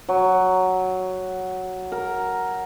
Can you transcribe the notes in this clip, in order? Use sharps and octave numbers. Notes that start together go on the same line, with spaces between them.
F#3
A#4